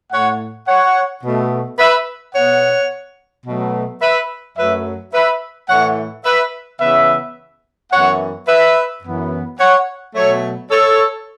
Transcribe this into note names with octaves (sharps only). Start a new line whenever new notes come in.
A2 A3 C#5 F#5
C#5 F#5
B2 A3
B4 E5
B2 B3 C#5 F#5
B2 F#3 A3
B4 E5
F#2 F#3 A3 B4 E5
B4 E5
A2 E3 A3 C#5 F#5
B4 E5
C#3 E3 B3 B4 E5
F#2 E3 B3 C#5 F#5
B4 E5
F#2 E3 B3
C#5 F#5
B2 F#3 A3 A4 C#5
A4 C#5